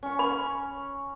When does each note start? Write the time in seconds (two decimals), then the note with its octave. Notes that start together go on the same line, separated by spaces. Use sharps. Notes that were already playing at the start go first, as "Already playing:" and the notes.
0.03 C#4 G#5 C#6
0.19 B5